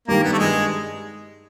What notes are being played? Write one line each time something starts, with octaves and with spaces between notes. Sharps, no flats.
G2 D#3 G3 A#3
B3
A3
G2 D#3 G3 G#3